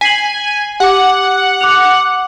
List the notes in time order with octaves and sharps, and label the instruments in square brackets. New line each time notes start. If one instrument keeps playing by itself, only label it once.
[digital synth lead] G#5 [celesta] B6 C7 F#7
[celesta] G4 D6 [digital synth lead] F#5
[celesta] D6 F#6 F7